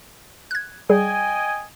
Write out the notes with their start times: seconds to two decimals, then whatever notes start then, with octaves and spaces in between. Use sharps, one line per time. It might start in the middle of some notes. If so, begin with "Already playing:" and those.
0.51 F#6 G#6
0.90 G3 G#4 D#5 G5 G#5